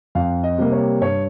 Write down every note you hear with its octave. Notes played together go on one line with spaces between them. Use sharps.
F2 F5
D#5
C3 G3 A#3
C#5
G2 C#5